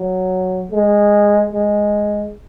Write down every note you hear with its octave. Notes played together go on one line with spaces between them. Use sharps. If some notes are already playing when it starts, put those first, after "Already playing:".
Already playing: F#3
G#3
G#3